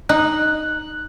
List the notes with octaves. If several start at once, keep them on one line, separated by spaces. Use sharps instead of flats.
D#4 F#6